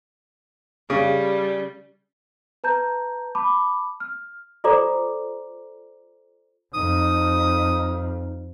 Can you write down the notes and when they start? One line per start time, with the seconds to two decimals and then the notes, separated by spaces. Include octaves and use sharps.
0.90 C#3 G3
2.64 B4 A5 A#5 G6
3.35 A5 B5 D6
4.00 F6
4.64 F4 A4 C5 D5 A#5 D6
6.74 F2 D#4 D#6